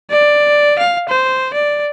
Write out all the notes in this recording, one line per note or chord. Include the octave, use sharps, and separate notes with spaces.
D5
F5
C5
D5